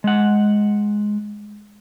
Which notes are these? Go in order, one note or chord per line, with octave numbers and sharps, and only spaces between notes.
G#3 F#5